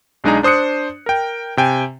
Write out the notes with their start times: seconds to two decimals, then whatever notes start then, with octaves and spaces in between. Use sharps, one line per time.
0.24 B1 G#3 D4 D#4 G#4 A#5
0.43 D4 C5 D#6 F#6 C#7
1.06 A#4 G5
1.57 C3 G5 G#5